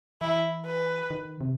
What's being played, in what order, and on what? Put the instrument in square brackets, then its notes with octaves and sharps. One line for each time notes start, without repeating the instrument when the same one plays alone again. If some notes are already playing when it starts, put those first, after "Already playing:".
[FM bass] E3 [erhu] E4
[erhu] B4
[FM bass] D#3
C3